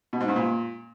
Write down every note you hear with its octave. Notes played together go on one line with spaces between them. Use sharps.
B2
G#2
G2
A#2